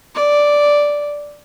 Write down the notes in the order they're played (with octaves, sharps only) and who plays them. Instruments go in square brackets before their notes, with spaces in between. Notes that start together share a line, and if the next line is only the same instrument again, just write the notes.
[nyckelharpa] D5